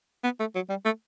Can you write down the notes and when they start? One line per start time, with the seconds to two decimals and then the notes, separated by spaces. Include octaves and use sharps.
0.24 B3
0.40 A3
0.55 F#3
0.69 G3
0.85 A3